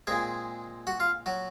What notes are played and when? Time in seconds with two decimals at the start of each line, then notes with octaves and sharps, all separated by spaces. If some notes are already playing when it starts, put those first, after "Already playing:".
0.07 A#2 G#3 C4 G#4 G#5
0.87 F#4 F#5
1.00 F4 F5
1.26 F#3 F#4